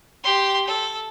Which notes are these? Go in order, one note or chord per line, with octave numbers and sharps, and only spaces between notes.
G4 C6
A4